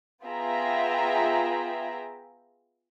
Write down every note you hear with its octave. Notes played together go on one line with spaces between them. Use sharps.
B3 F4 G#4 E5 G5 A#5